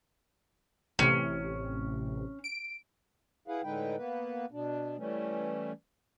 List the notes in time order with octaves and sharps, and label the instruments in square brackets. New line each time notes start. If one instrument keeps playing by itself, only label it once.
[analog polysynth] A1 C3 [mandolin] C#4
[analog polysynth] D7
[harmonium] E4 G#4 B4 F5 F#5
A2 D3 G#3 D#4 B4 G5
A#3 B3 B4
B2 D4
E3 G3 A3 C#4